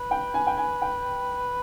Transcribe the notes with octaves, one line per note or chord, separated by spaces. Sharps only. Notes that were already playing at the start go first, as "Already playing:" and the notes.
Already playing: B4
G5
G#5
G5
G#5
G5